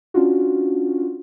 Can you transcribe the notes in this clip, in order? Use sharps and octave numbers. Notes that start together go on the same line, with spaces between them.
C#4 D4 F4 F#4